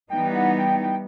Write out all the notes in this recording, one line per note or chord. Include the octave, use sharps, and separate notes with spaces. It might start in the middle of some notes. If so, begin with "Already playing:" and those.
E3 G3 B3 D#4 G5
F#5
G5
G5